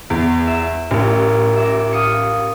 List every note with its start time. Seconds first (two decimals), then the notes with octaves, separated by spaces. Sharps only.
0.10 E2
0.47 E5
0.91 A1 F4 A#4
1.56 E5 D6 A#6
1.93 F5 D#6 C#7